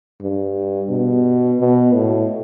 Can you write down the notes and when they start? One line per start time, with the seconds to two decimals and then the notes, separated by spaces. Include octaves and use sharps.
0.21 G2
0.90 B2
1.60 B2
1.94 A2